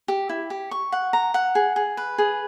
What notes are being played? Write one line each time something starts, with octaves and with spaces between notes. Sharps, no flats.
G4
E4
G4
C#6
F#5
A#5
F#5
G#4
G#4
B4
G#4